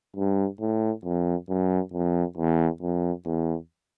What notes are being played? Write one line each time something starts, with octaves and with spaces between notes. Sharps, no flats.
G2
A2
F2
F#2
F2
E2
F2
E2